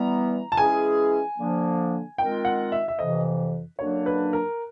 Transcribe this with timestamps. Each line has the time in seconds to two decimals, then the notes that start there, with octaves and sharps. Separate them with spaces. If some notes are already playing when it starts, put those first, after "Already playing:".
Already playing: E3 G3 B3 A#5
0.52 A5
0.57 E3 G#3 C#4 E4 G#4 G#5
1.38 D3 F3 A#3 D4
2.18 D#3 G#3 C4 F4 A#4 G5
2.45 F#5
2.72 E5
2.88 E5
2.98 F2 C3 E3 D#5
3.79 F#2 D3 F#3 A#3 D4 C#5
4.06 B4
4.33 A#4